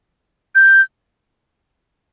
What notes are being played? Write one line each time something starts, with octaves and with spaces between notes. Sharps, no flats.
G6